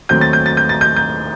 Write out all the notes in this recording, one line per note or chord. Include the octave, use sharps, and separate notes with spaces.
D#2 D#3 F#3 A3 C4 G6
A6
G6
A6
G6
A6
G6
G6